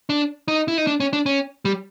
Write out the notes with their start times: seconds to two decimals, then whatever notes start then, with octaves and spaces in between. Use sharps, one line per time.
0.09 D4
0.48 D#4
0.68 E4
0.78 D#4
0.87 D4
1.00 C#4
1.13 D4
1.26 C#4
1.65 G3